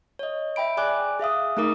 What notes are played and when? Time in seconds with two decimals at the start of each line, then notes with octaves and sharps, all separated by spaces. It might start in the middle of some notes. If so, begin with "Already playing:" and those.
0.19 C#5 D#5
0.56 E5 G5 B5 D7
0.77 G#4 D5 G#5 D6 F#6
1.19 G#4 E5 F5 D#6
1.57 A3 D#4 G#4 A#4 D6 D#6